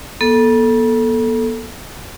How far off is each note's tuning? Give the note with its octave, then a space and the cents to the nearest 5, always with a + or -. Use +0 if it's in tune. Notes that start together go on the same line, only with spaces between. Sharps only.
B3 -45 A4 +0